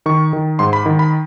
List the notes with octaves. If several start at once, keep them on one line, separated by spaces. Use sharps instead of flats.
D#3 C#6
D#3
G#2 C6
B5
D#3
B5